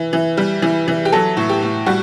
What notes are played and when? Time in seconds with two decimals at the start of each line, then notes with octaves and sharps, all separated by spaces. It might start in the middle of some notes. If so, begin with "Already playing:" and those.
Already playing: E3
0.13 E3
0.37 G3
0.62 E3
0.88 E3
1.05 G4
1.12 F#3 A4
1.37 A2
1.49 G4
1.62 A2
1.86 G3 F#4